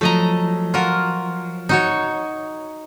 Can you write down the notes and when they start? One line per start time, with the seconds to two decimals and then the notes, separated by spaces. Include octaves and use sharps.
0.01 F3 F#3 A3 D#5 A#5
0.74 F4 F#4 A#4
1.69 D#4 F#4 C#5